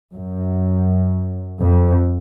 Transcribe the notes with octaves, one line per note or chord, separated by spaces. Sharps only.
F#2
F2